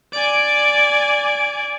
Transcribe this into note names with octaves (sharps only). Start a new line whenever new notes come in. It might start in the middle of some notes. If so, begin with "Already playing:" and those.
D5 G#5 D7